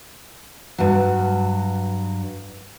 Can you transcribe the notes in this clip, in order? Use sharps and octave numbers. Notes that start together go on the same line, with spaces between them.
G2 F#3